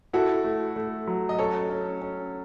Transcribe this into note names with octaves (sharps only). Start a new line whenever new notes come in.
E4 F#4 A4
A3
A3
F#3
D#5
C#4 A4 C#5
C#4
C#4